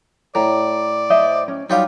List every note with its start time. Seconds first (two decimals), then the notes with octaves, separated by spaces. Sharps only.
0.35 A2 D5 A#5
1.10 C5 D#5 E5
1.48 C#4
1.70 F#3 G3 D#4 F4 G4 F5